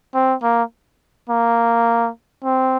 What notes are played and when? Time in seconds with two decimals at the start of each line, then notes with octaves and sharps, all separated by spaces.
0.14 C4
0.43 A#3
1.29 A#3
2.44 C4